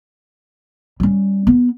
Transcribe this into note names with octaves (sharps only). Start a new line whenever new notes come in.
G3 C#4
B3